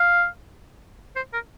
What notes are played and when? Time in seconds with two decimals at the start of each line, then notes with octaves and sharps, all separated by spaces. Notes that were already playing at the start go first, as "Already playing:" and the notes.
Already playing: F5
1.16 C5
1.33 A#4